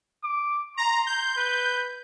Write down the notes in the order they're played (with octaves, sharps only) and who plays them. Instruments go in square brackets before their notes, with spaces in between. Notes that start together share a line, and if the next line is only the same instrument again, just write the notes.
[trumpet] D6
[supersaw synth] A#5 [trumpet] C6
[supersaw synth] G6
[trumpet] B4